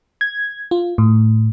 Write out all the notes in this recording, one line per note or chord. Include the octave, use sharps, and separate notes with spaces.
G#6
F4
A2